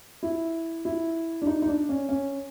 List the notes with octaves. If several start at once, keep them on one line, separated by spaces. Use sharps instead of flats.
E4
E4
D4
D#4
D#4
D4
C#4
C#4